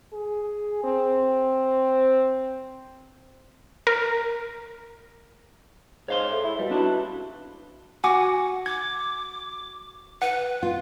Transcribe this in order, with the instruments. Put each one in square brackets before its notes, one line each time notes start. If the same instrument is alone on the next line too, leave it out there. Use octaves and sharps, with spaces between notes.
[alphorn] G#4
C4
[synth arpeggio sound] A#4
[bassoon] G#2 [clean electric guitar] C#5 F5 C6
[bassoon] A3
E4
[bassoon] B2 [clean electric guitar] G3
[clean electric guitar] D4 E4 F#4
[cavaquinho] F#4 [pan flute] F#5 [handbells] G#5 D6
[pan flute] D6 [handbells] G#6
[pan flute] B4 [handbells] F#5
[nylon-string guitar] F4